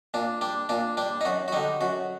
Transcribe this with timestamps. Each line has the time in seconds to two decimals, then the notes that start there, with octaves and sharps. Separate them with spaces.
0.14 A#2 D4
0.41 G3 D4
0.69 A#2 D4
0.97 G3 D4
1.21 D#4
1.25 F#2 F#4
1.48 F#4
1.52 D3 G3 D#4
1.81 F#2 F#4